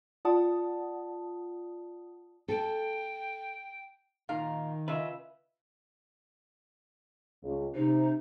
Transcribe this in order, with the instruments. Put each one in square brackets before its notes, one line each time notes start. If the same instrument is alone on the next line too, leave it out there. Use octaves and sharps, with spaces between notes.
[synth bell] F4 D5 F#5 A5 D#6
[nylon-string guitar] A4 [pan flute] G5
[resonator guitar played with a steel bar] A#2 F5 A#5 [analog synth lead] D#3
[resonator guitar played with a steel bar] C#3 D#5 [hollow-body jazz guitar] F4 B4 [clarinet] E5
[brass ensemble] C#2
[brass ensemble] C3 [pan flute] D#4